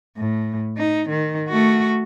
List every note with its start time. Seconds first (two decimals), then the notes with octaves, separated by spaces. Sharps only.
0.17 A2
0.77 D#4
1.09 D#3
1.49 A3 F#4